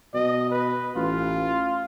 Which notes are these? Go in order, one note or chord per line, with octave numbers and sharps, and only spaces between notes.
B2 D#5
B4
A1 F4